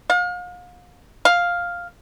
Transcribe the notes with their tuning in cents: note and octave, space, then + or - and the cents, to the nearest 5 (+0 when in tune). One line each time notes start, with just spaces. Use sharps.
F5 +40
F5 +5